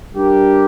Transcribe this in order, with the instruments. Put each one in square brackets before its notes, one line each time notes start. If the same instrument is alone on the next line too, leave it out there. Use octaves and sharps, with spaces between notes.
[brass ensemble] G3 D4 G4 A#4